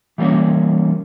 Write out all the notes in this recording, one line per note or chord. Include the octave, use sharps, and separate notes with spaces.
E3 G3 A#3 C#4